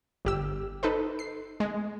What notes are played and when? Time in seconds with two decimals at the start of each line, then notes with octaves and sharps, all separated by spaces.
0.25 G1 G4 E6
0.83 D#4 A4 B4 C5
1.19 C7
1.60 G#3